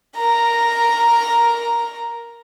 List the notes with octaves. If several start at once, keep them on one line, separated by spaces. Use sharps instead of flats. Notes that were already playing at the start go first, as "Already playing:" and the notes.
A#4 A#5